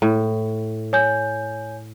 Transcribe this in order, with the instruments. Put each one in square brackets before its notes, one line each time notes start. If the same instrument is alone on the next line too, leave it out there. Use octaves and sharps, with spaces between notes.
[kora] A2
[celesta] C#5 G#5 G6